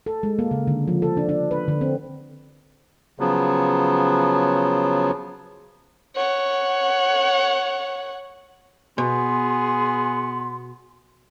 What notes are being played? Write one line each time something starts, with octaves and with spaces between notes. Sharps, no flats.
A4
G#3
A#3
C#3
D3
F3
A4
D4
D4
B4
D3
C4
C#3 F3 F#3 B3
C#5 F#5
B2 B3 G#4 C6